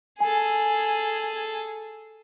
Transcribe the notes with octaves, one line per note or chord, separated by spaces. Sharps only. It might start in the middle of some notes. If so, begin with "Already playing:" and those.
G#4 A4 G#5